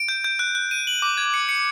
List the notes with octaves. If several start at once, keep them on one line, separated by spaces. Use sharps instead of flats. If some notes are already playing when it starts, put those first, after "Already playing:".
Already playing: D7
G6
G6
F#6
F#6
D#7
F#7
D6
G#6
C#7
C#7